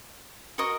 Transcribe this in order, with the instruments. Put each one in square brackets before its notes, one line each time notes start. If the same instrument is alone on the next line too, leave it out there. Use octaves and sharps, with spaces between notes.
[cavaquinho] F#4 A#4 D#5 C#6